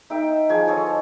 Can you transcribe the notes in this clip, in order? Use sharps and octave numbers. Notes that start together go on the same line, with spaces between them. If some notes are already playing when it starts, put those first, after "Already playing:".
D#4 E5 G5
F3 G#4 G#5
A4 C5 C#5 D#5